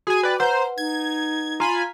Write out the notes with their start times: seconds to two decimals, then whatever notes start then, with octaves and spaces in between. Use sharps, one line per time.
0.07 F#4 G#4 G#5
0.23 B4 D5 G5
0.40 B4 C5 F#5 A#5
0.78 D#4 G#6
1.60 F4 G#5 A#5 B5